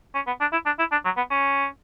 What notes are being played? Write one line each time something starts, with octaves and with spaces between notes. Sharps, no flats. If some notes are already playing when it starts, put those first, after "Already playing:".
C#4
B3
D4
E4
D4
E4
D4
F#3
B3
C#4